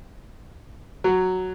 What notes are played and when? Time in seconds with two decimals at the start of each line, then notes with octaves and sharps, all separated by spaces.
1.04 F#3